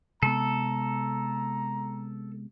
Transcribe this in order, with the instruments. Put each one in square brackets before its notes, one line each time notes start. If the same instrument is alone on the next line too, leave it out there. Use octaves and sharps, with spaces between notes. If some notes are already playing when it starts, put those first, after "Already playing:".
[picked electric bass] C3 G#3 B3 [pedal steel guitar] A4 [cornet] A#5